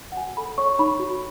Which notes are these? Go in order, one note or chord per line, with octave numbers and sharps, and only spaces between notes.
F#5
F#4 G#5
A4 B5
C#5 C#6
D#4 B5
F#4